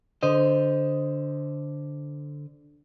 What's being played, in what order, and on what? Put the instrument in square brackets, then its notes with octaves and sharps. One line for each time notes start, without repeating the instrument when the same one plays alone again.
[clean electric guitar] D3 C5 D#5